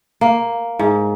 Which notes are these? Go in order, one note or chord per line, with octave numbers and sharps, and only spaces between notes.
A#3
G#2